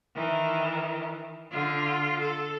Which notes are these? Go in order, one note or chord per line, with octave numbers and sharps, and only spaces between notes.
D#3 E3
D3 F4
A4